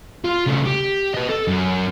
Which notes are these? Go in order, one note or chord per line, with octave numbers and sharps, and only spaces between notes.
F4
C#3 A3
G4
B4 D#5
A4
F#2